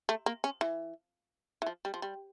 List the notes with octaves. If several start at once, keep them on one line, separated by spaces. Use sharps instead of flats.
A3
A#3
C#4
E3
E3
F3
G3
F3
G3